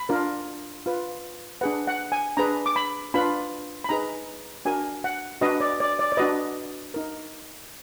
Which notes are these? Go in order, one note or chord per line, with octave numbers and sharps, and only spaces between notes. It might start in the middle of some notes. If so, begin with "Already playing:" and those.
Already playing: B5
D4 F4 A#4
F4 B4
D4 G#4 B4 F#5
F#5
G#5
D4 G#4 B4 A#5
D6
B5
D4 F4 B4 B5
B5
D#4 G#4 B4 A#5
D4 F#4 A#4 G#5
F#5
D4 F#4 B4 D#5
D5
D5
D5
D5
D4 F#4 B4 D#5
D#4 A#4